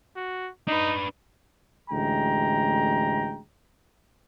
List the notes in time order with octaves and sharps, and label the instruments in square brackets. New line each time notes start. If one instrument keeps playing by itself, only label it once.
[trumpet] F#4
[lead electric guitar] D4 B4 [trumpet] D#4
[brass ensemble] A1 D2 G#3 G5 A#5